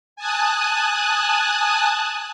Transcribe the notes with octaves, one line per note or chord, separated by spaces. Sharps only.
G#5 A5 D#6 F#6